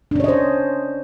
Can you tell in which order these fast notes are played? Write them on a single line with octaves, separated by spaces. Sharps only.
D4 C#4 C#5 D#5 C5